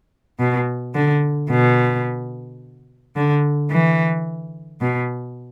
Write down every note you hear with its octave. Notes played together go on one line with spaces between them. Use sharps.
B2
D3
B2
D3
E3
B2